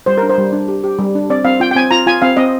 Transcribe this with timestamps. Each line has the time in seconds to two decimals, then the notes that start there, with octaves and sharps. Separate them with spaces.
0.06 G3 C5
0.18 A#4
0.23 D4
0.30 C5
0.38 G3
0.53 D4
0.68 G4
0.84 G4
0.99 G3
1.15 D4
1.30 C4 D5
1.45 C4 F5
1.60 F4 G5
1.71 G5
1.76 C4 G#5
1.91 F4 A#5
2.07 F4 G#5
2.22 C4 F5
2.37 C4 D#5